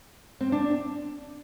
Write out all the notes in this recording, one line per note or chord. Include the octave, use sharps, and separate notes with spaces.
C4
D4